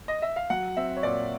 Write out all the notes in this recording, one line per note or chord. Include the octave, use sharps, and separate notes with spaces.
D#5
E5
F5
F#3 F#5
C4 E5
C#5
A#2 D5